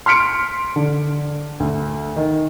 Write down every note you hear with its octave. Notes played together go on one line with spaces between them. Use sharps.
C6 F6 B6 C#7 D7
D3
D2
D#3